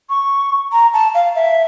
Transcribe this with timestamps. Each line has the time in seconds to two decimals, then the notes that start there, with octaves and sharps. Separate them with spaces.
0.10 C#6
0.72 A#5
0.94 A5
1.14 F5
1.35 E5